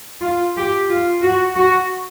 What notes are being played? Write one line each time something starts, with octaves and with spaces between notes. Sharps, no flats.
F4
G4
F4
F#4
F#4